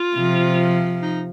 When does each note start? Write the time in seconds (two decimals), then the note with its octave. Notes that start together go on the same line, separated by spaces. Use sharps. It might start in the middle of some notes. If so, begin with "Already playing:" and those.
Already playing: F4
0.16 C3 F3
1.02 D#4